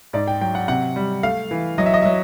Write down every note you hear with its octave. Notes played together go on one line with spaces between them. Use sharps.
G#2 D5
G5
F#3 G5
F#5
C3 F#5
G3
A3 F5
E3
F#3 D#5
E5
D#5
E5
F#3